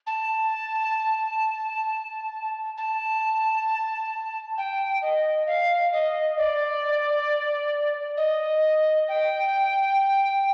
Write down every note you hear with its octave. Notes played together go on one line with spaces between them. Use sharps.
A5
A5
G5
D#5
F5
D#5
D5
D#5
G5